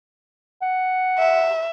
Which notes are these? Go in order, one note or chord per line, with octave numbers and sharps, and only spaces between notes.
F#5
E5